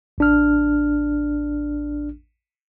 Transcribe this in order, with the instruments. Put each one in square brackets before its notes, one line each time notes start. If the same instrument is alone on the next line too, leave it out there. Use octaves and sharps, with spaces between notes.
[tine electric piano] A1 D4 F6